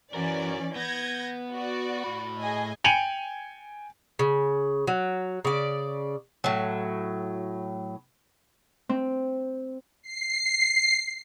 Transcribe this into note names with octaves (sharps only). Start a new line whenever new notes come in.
E3 C#4 F#4 A#4 D5
B3 G6 G#6 A#6
F#4 D5
A2 B5
G#4 D#5 G#5
G5 G#5 C#7 D#7 F7 F#7
C#3
F#3
C#3 D5
A2 F#3
C4
C7